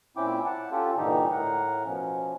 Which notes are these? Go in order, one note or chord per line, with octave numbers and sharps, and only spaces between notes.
A#2 C4 C#4 E4 G5 D6
F#5 A5
C#4 F4 G4 A4
G2 A#2 D3 E3 D#4 G4
A2 A#4 F#5
B2 F3 C#4